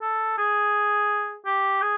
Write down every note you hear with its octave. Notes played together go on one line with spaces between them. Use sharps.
A4
G#4
G4
G#4